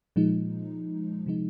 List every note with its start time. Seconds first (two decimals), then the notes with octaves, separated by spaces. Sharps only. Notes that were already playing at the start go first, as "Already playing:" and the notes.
0.16 A#2 F3 G#3 D#4
1.26 C3 F3 G#3 D#4